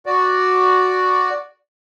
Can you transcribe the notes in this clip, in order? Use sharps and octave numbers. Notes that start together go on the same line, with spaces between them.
F#4 D5